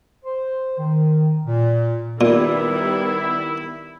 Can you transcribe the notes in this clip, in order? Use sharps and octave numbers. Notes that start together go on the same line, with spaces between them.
C5
D#3
A#2
A#2 D#3 G3 B3 E4